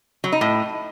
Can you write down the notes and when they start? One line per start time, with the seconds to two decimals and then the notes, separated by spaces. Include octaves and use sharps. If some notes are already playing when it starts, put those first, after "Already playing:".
0.24 F#3
0.32 D#4
0.41 A2